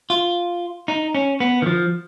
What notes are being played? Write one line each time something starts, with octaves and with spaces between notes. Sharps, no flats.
F4
D#4
C#4
B3
D#3
F3